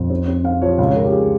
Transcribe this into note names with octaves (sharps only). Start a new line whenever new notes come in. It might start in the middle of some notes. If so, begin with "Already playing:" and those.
Already playing: F2
C4
C4
C4 F5
F3 C#5
C#2 F5
C#5
C#2 A#4
G4
G#4